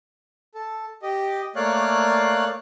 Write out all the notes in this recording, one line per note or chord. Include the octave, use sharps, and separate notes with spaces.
A4
G4 D#5
A3 A#3 C#5 D5 F5 F#6